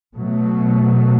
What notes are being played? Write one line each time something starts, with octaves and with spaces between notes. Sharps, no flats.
B2 F#3 A3